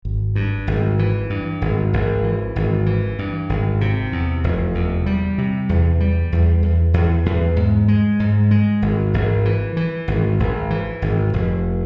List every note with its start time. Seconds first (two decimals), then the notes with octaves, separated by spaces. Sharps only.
0.05 G#1
0.35 G2
0.67 G#1
0.99 E3
1.30 G2
1.62 G#1
1.93 G#1
2.24 E3
2.56 G#1
2.86 E3
3.19 G2
3.49 G#1
3.81 C3
4.12 E2
4.44 F1
4.75 E2
5.06 G3
5.38 C3
5.69 E2
6.00 G3
6.32 E2
6.63 E2
6.94 E2
7.26 E2
7.56 G#2
7.88 G#3
8.20 G#2
8.51 G#3
8.82 G#1
9.14 G#1
9.45 E3
9.77 E3
10.08 G#1
10.40 G#1
10.70 E3
11.02 G#1
11.33 F1